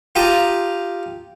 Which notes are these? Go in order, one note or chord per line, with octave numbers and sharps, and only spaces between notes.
F4 G4 A5 A#5 D#6